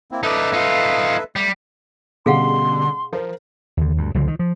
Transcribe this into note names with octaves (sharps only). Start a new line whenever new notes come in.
A#3 C4 E4
D#4 A4 B4 D5 E5
D#4 F4
G3 A3
B2 D3 G3 C#4 G#4 F5 F#5 C6
F3 A#4 C5
D#2 D3
D2 G2
C#2 D3 F3 F#3
D#3
F3